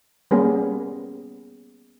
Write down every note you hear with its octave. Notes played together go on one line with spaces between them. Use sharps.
G3 A#3 B3 C#4 G4 G#4